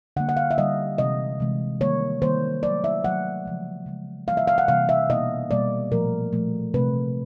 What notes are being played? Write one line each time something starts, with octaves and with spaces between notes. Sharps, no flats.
D3 G3 A#3 F#5
F#5
F5
E5
D3 G3 A#3 D#5
C3 E3 G#3 D#5
C3 E3 G#3
D#3 G3 A#3 C#5
D#3 G3 A#3 C5
D#3 F#3 A3 D5
E5
D#3 F#3 A3 F#5
C#3 F3 G#3
C#3 F3 G#3
C3 E3 G3 A#3 F5
E5
F5
F#5
C3 E3 G3 A#3 F5
E5
B2 G3 A#3 D#5
B2 G3 A#3 D5
A#2 F3 A3 A#4
A#2 F3 A3
C3 E3 A3 B4